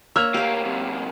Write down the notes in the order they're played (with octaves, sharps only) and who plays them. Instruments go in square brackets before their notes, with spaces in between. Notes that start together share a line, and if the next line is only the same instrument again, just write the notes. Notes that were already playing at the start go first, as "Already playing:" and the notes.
[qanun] A#3 C#5 E5 [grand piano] E6 F6 F7
[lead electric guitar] D2 A#3 [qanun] G4 F5
[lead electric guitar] F#2 C3